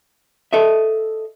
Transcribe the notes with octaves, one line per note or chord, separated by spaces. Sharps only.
A4 D#5 E5